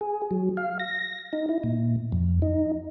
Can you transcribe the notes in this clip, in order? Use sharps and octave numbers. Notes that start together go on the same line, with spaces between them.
G#4
F#3
F5
A#6
D#4
E4
A#2
F2
D#4